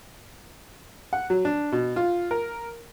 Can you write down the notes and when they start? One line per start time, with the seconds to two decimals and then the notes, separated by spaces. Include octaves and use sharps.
1.13 F#5
1.30 F#3
1.45 D4
1.72 B2
1.96 F4
2.31 A#4